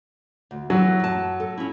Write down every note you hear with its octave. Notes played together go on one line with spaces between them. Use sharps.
D2
E3 F#3
F#2 A5
A4
C#4 E4